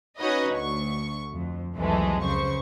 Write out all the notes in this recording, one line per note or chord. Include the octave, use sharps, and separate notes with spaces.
C#4 D#4 F#4 B4 C#5 D#5
D2 C#6
F2
C2 F2 E3 F#3 G#3 A3
C#2 C#3 C5 C#6